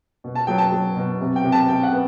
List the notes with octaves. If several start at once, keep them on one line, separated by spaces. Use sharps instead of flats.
B2
A5
F#3 G5
A5
F#3
B2
C3
G5
C3
A5
C3 G5
F#5
B3